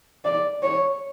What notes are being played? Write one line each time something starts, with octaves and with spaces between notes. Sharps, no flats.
D5
C#5